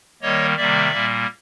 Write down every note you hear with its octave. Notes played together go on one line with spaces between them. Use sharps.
D#3 G3 A#3 C#5 D#5
C3 D#3 G3 A#3 D5 E5
A#2 G3 A#3